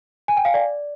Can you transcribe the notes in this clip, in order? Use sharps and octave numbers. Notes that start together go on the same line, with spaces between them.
G#5
G5
F5
D5